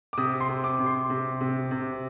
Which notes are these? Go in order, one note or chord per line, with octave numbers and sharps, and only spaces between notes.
D6
C3 D#6
C6
C3
D6
C3
C6
C3
C3
C3